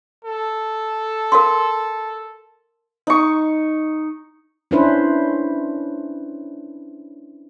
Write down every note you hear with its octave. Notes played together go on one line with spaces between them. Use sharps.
A4
A#4 F5 C6
D#4 C#6
C#4 D4 E4 B4 C5